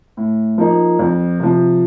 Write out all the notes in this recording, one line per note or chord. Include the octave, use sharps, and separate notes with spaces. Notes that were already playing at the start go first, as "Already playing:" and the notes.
A2
F3 A#3 D#4
F2
C3 F3